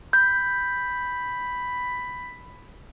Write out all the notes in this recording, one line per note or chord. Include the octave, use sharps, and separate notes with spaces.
B5 G6